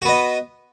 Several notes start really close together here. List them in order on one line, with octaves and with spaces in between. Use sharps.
F#4 B3 D#5